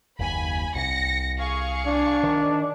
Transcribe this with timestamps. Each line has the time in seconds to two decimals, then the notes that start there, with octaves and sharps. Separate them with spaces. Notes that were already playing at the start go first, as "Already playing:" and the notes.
0.19 F#1 D#2 G#5 B5
0.75 C2 A#6 C#7
1.37 G#4 F5 C#6
1.86 D4
2.23 D#3